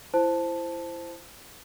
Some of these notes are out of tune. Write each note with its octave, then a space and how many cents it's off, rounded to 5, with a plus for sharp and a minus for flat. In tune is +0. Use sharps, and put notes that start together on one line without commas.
E4 +25 C5 -5 A5 +0